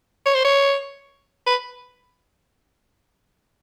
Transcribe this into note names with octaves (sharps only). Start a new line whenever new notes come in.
C#5
C5
C#5
B4